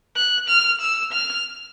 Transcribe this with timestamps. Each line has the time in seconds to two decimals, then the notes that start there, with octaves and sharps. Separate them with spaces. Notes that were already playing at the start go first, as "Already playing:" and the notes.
0.16 F#6
0.48 F6
0.81 E6
1.12 F6